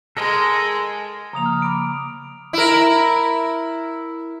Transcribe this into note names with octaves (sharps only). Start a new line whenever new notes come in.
G#3 A4 A#4 D#5
C#3 F3 A#3 A#5 D#6 F7
F6
B5 D6 D#6 D7
E4 A#4